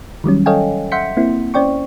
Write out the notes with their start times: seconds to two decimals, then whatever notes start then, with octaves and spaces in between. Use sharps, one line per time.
0.24 D#3 F#3 G3 C#4
0.46 A4 C#5 D#5 F5 G5 G#5
0.92 E5 F#5 C6 G6 B6 C#7
1.17 A#3 C4 E4
1.54 C#4 C5 D5 G5 C#6